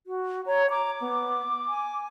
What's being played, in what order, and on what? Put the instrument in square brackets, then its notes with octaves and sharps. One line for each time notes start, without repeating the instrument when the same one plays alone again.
[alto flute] F#4
[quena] C#5 [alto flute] A#5
[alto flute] A#5 [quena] D6
[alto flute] B3
G#5